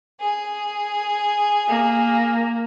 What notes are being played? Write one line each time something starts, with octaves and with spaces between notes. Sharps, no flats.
G#4
A#3